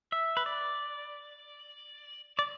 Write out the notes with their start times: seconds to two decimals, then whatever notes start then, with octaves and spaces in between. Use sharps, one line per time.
0.12 E5
0.37 B4
0.46 D5
2.39 D5